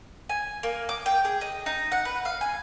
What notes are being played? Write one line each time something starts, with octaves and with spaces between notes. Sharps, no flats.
G#5
A#3
D6
G5
G#4
D#5
D#4
F#5
B4
F5
G#5